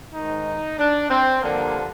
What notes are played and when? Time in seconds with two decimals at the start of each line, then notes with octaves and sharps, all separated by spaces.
0.13 G#2 D#3 D#4
0.78 D4
1.10 C4
1.42 G2 D3 F3 A#3